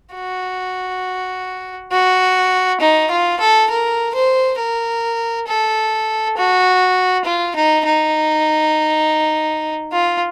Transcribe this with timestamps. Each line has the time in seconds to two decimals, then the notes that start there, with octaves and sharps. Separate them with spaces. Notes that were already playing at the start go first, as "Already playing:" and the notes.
0.15 F#4
1.92 F#4
2.80 D#4
3.11 F4
3.40 A4
3.70 A#4
4.15 C5
4.59 A#4
5.48 A4
6.37 F#4
7.25 F4
7.55 D#4
7.86 D#4
9.92 F4